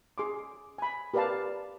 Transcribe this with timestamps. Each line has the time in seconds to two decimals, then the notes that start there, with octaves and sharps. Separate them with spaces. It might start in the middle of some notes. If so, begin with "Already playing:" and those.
0.18 G#4 C6 D6
0.78 G#5 B5
1.14 G4 A#4 B4 D5 F5 A5